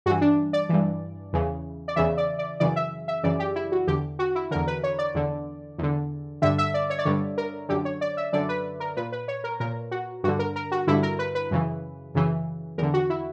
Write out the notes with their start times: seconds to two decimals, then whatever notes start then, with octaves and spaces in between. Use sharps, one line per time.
0.06 G2 F#4
0.10 E3
0.21 D4
0.53 D5
0.69 G2 E3
1.33 E2 C#3 E3
1.88 D5
1.96 E2 C#3 E3 E5
2.17 D5
2.39 D5
2.60 F#2 C#3 E3 D5
2.76 E5
3.08 E5
3.23 F#2 C#3 E3 D5
3.39 G4
3.56 E4
3.72 F#4
3.87 E2 D3 G4
4.19 F#4
4.35 E4
4.51 D3 A#4
4.55 E2
4.67 B4
4.83 C#5
4.98 D5
5.14 E2 D3
5.78 E2 D3
6.42 G2 D3 E5
6.58 E5
6.74 D5
6.90 C#5
6.99 D5
7.05 G2 D3 C#5
7.38 A#4
7.69 F#2 D3 G4
7.85 C#5
8.01 D5
8.17 E5
8.33 F#2 D3 D5
8.49 B4
8.80 A#4
8.97 A#2 B4
9.12 B4
9.28 C#5
9.44 A#4
9.60 A#2 A#4
9.91 F#4
10.24 G2 F#4
10.28 D3
10.39 A#4
10.56 A#4
10.71 F#4
10.87 G2 D3 E4
11.03 A#4
11.19 B4
11.35 B4
11.51 F#2 C#3 E3
12.15 F#2 C#3 E3
12.78 E2 A#4
12.82 D3
12.94 F#4
13.10 E4